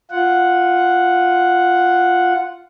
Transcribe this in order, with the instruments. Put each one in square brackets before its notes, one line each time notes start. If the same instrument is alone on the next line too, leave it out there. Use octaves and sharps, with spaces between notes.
[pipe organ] F4 F#5